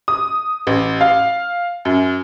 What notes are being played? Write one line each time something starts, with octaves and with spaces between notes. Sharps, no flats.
D#6
A1
F5
F#2